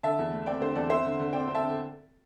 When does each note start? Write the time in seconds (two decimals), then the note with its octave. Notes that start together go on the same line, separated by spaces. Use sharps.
0.03 D3 E5 A5
0.19 E2
0.32 A3
0.46 C4 D5 G5
0.61 D3 G4 C5
0.75 E2 A4 D5
0.90 C4 C5 E5
1.05 D3
1.19 D3
1.33 C4 D5 G5
1.47 C4
1.54 E5 A5
1.62 D3